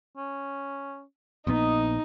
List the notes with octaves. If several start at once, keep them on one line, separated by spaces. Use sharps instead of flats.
C#4
A#1 A#2 B3 D#4 D#5